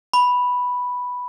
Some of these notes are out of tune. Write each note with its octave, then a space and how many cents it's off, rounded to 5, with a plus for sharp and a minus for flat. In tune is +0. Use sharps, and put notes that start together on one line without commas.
B5 +0